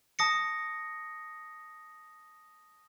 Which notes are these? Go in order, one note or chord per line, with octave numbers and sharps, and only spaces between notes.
A5 D#6 A#6 C#7